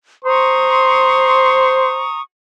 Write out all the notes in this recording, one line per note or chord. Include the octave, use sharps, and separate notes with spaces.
C5 A#5 C6 C#6 D#6